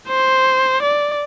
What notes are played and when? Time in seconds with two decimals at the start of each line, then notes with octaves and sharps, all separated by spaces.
0.08 C5
0.82 D5